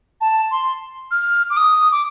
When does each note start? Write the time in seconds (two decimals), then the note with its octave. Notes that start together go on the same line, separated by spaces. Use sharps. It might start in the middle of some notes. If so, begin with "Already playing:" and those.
0.21 A5
0.51 C6
1.11 F6
1.50 D6
1.57 D#6
1.92 D6